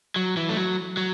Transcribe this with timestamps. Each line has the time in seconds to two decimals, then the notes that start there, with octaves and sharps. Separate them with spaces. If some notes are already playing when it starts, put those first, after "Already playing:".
0.16 F#3
0.37 E3
0.49 A3
0.57 F#3
0.97 F#3